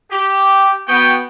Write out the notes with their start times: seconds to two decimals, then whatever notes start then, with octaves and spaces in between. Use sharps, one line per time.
0.11 G4
0.87 B3 F#4 G5